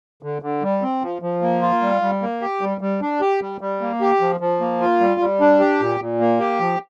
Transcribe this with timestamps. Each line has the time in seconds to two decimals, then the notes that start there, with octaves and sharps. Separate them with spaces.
0.23 D3
0.42 D3
0.63 G3
0.82 C4
1.02 F3
1.22 F3
1.42 A#3
1.62 F4
1.82 G3
2.02 G3
2.22 A#3
2.41 G4
2.61 G3
2.81 G3
3.02 D4
3.21 G4
3.41 G3
3.61 G3
3.81 A#3
4.01 G4
4.21 F3
4.40 F3
4.61 A#3
4.80 F4
5.00 G3
5.20 G3
5.41 D4
5.60 G4
5.80 A#2
6.00 A#2
6.20 A#3
6.40 G4
6.60 F3